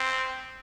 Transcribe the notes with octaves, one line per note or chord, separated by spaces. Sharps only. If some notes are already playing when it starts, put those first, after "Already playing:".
Already playing: C4